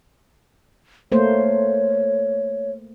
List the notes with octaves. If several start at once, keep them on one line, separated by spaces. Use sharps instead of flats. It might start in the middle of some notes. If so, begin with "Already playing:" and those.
A3 A#3 C5 C#5